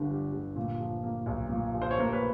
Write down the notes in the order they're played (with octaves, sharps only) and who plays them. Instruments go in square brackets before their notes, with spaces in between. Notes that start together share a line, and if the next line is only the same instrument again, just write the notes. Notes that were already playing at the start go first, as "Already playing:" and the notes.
Already playing: [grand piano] G1 G2 D3
G3
G1
A#2
F3
A#3
B1
A#2
F3
C5
C#5
A#3 A#4 C5
B4 C#5